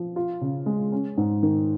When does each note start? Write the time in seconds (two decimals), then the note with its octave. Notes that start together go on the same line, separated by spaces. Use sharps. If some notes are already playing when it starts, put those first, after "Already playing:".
Already playing: F3
0.16 F4
0.41 C#3
0.66 G#3
0.92 C#4
1.18 G#2
1.43 D#3